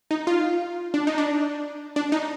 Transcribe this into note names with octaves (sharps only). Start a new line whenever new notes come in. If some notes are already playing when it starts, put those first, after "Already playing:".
D#4
F4
D4
D#4
D4
D4
D#4